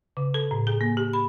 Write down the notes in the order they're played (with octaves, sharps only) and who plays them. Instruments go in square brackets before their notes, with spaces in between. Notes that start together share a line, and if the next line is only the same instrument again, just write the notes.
[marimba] C#3
A4
A2
G#4
A#3
G4
B5